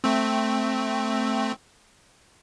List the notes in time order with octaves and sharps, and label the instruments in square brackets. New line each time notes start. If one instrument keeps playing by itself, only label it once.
[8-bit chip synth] A3 C4